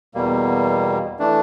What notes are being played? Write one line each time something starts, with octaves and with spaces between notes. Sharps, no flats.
E2 B2 G3 A#3
E3 A3 D4